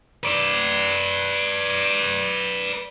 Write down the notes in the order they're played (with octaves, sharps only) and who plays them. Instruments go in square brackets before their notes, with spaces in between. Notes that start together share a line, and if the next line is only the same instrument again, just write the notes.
[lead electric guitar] B4 D5